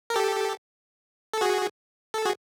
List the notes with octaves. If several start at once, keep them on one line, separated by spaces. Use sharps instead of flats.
A#4
G4 A4
A4
F#4 G#4
A4
F#4 G#4